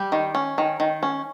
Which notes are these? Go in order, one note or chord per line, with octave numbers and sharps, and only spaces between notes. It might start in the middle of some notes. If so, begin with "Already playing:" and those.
Already playing: G3 G4
D#3
C#4
D#3
D#3
C#4